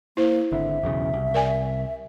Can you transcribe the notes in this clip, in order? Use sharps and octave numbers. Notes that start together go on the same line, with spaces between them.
A#3 E4 C5
G#1 D3 E5
B1 E2 C#3
C2
A#4 D5 G#5